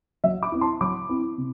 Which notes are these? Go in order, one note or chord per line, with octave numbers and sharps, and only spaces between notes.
F#3 E5
B5 D6
C4 E4
A5 C6
F#3 B5 D6
C4 E4
C3